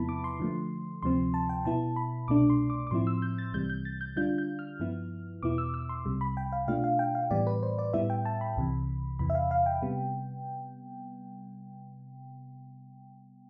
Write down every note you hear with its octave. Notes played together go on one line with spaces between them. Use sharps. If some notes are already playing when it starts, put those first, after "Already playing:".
Already playing: E2 C3 F3 B3 E4 A5 B5
D6
C6
D3 F3 A3
D2 C3 F3 C4 C6
A5
G5
B2 B3 E4 A5
B5
C2 B2 A3 D4 D6
C6
D6
D6
A2 F3 C4 E4 C6
E6
G6
A6
C2 C3 E3 G3 G6
G6
A6
G6
D3 G3 D4 F4 G6
G6
F6
G2 F3 B3 E4
E2 B2 B3 E4 D6
E6
E6
C6
C2 C3 G3
B5
G5
F5
B2 A3 D4 F4 F5
F5
G5
F5
A2 E3 G3 B3 D5
B4
C5
D5
A2 G3 B3 E4 E5
G5
A5
B5
C2 C3 E3
E2 C3 E3 B5
E5
F5
F5
G5
C3 G3 B3